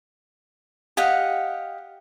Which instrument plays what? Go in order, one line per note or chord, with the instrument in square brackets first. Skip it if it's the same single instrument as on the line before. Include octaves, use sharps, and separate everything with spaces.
[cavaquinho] G4 D#5 F5 F#5